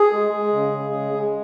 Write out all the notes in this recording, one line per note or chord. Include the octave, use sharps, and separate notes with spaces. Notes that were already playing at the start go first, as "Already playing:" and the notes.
Already playing: G#4
G#3
G#3
C#3
C#3
G#3
G#3